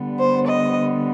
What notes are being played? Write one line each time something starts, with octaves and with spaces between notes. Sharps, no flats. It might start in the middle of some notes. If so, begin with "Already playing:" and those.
Already playing: D3 G3 B3
C5
D#5